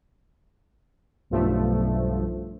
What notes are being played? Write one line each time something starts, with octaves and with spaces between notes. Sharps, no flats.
B1 G2 F3 A3